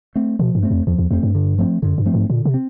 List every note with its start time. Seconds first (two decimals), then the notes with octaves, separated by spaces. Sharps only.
0.15 A3 C4
0.39 B2 F3
0.55 G2
0.63 A3 C4
0.70 F2
0.87 E2 F3
0.99 E2
1.11 F2 A3 C4
1.23 G2
1.35 D3
1.58 F3 A3 C4
1.82 F#2 D3
1.98 G2
2.05 F3 A3 C4
2.14 G#2
2.30 A#2 D3
2.45 C3
2.54 C4